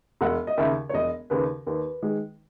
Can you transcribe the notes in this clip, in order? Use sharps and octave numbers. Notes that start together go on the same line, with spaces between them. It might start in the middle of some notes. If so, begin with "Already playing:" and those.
E1 F#5
D#5
D#2 C#3 E5
C#5
E1 D#5
D#2 C#3 B4
D#2 B4
D#3 G#3